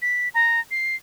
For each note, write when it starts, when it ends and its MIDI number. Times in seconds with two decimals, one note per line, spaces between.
0.02 0.29 95
0.34 0.60 82
0.71 0.96 96